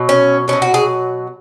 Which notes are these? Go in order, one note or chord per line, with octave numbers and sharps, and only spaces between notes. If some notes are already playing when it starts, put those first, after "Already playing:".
Already playing: B2 F#3
C#4
B2 F#3 C#4
F#4
G#4